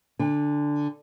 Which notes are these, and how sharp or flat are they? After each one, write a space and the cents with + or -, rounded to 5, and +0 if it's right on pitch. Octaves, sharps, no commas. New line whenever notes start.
D3 +0 G#5 -40